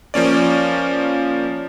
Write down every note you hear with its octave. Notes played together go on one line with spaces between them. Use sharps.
F3 A#3 C#4 D5